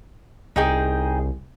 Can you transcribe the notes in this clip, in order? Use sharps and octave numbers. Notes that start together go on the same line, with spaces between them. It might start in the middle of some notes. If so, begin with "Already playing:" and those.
C2 D#4 G#4 G5